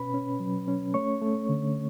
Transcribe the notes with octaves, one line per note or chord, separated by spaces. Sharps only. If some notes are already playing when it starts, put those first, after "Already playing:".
Already playing: B2 C#4 B4 B5
C#4
F#3
C#4
A3 C#5 C#6
A3
D3